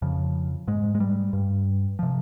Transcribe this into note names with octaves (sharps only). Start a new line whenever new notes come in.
F2 C#3 F3
G#2 G#3
G#3
G3
G2
C3 F3